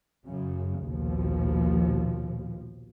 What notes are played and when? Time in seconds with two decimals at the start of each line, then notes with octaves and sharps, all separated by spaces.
0.25 F#2 C#3
0.82 A#1 D#2 B2 F3